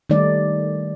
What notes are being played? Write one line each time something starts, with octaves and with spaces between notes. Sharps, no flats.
D#3 G3 A3 D#4 D5